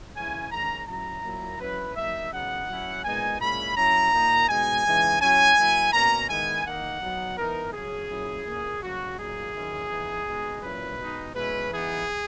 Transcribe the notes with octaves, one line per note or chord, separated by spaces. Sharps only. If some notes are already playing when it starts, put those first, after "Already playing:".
C#3 E3 G#3 C#4 E4 G#5
D#3 G#3 C#4 A#5
F#3 C#4 E4 A#5
A#2 F#3 A#3 E4
F#3 C#4 E4 B4
F#3 A#3 D#4 E5
C#3 F#3 B3 D#4 F#5
F#3 C#4 E4
A#2 G#3 B3 D#4 G#5
A#2 G#3 C#4 E4 B5
F#3 C#4 E4 A#5
A#2 A#3 D#4
B2 G#3 D#4 G#5
C#3 E3 G#3 D#4
F#3 C#4 E4 G#5
F#3 A#3 E4
B2 A#3 C#4 A#5
D#3 G#3 B3 E4 G#5
D#3 A#3 D#4 F#5
F#3 B3 D#4
E3 B3 D#4 A#4
C#3 F#3 C#4 G#4
A#2 F#3 C#4 E4
A#2 A#3 C#4
C#3 F#3 A#3 F#4
A#2 F#3 A#3 D#4 G#4
D#3 F#3 C#4 E4
E3 B3 D#4
B2 G#3 D#4
A#2 F#3 C#4 E4 B4
B2 G#3 D#4
B2 G#3 C#4 E4 B4
E3 B3 D#4 G#4